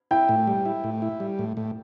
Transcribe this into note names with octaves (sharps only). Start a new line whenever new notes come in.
E4 G5
A2
G3
E4
A2
E4
G3
A2
A2